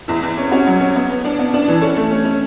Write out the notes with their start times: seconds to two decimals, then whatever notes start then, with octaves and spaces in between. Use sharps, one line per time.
0.08 E2 E4
0.23 E2
0.38 C#4
0.52 C#4 F#4
0.67 F#3
0.81 C#4
0.96 B3
1.10 B3
1.25 D4
1.39 B3
1.54 D4
1.68 E3
1.81 C#4 A4
1.97 A3
2.11 C#4
2.25 C#4